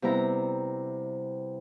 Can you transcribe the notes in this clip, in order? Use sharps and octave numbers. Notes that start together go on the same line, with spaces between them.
C3 G3 B3 E4 A#5